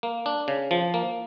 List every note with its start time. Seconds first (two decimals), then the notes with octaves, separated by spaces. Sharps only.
0.03 A#3
0.26 D4
0.48 C#3
0.71 F3
0.94 A#3